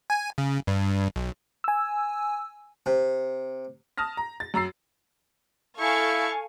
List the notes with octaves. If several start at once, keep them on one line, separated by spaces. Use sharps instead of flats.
G#5
C#3
G2
B1
G#5 E6
C3
A5 D#6 F6 A#6
A#5
A6
F#2 A#5 E6 C7
E4 A4 F5 G#5 C#6